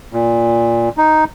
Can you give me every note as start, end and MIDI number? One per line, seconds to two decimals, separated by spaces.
0.13 0.89 46
0.98 1.24 63